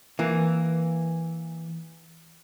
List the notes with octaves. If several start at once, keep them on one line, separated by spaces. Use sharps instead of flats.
E3 A#3